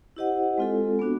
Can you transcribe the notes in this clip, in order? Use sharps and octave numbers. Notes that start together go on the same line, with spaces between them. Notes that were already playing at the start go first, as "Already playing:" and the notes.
E4 G4 C5 D#5 F#5
G#3 C4 F4 A4
B3 D4 F#4